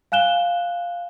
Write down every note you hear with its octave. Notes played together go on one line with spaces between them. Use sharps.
F5 G#5 F#6 E7 G7